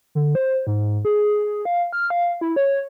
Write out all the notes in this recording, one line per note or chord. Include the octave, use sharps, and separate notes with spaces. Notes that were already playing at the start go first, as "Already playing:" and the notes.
D3
C5
G#2
G#4
F5
F6
F5
E4
C#5